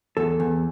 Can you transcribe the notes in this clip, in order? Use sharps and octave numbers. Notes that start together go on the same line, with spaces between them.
E2 A4
E2